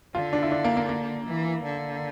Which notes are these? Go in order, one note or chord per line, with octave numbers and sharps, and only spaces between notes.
D3 F4
D4
E4
D4
A#3
A#3
A#3
E3
D3